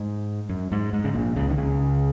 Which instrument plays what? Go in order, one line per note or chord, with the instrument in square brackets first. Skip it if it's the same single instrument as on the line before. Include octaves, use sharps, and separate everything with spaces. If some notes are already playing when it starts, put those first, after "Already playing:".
Already playing: [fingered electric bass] G#2
F#2
G#2
G#2
C#3
A#1 A#2
C#2 C#3
D#3
C#2 C#3